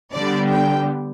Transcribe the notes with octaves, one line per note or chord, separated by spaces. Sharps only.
D3 G3 B3 D5
G5